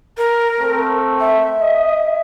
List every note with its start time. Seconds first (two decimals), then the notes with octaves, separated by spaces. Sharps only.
0.18 A#4
0.60 A3 C4
1.20 E5
1.60 D#5